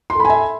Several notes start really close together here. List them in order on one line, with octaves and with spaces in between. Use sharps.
C6 A4 B5 G#5 E5